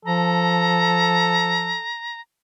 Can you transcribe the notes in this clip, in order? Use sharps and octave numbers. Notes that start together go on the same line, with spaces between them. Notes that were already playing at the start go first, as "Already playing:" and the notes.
F3 A4 A#5